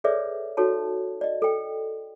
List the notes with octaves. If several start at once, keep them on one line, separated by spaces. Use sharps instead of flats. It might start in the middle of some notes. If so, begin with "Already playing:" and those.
G#4 A4 B4 C#5 D5 E5
D#4 F#4 A4 C#5 A5
D5 D#5
A4 G5